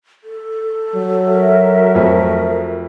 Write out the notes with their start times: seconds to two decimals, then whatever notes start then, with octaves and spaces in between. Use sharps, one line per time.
0.24 A4
0.94 F#3
1.27 F#4 A#4 E5
1.95 F2 F3 A3